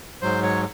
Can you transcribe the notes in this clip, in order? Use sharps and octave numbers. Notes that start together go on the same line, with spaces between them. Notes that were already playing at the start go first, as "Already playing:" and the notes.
G#2 F#3 C5
C#5